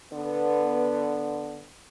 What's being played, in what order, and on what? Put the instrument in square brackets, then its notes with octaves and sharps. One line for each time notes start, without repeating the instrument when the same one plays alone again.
[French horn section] D3 B3